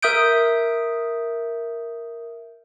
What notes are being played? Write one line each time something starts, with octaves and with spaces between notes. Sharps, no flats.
A#4 E5 D#6 G6 D7